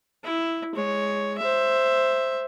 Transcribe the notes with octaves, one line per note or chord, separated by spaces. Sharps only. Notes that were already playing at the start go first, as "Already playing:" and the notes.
E4
G#3 C#5
C5 E5